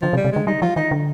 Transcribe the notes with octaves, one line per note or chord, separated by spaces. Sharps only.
D3 F3
C3
G3
C3
D3 G#3
G3 D#4
F3 F4
D#3 D#4
D3